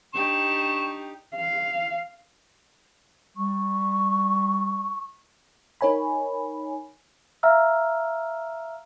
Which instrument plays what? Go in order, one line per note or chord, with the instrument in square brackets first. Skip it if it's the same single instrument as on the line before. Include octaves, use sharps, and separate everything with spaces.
[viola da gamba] D4 D#4 G4 [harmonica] C#6 [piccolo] E7
[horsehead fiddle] F5
[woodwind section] G3 [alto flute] C#6
[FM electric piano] D#4 A#4 C#5 G#5 B5
[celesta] E5 F5 A#5 E6 F6